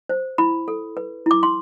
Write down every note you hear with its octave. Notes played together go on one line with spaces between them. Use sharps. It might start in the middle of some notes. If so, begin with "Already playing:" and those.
C5
E4 B5
A4
B4
E4 D6
C6